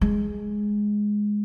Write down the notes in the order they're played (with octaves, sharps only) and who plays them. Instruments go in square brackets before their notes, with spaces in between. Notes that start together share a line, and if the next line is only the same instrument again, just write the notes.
[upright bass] G#3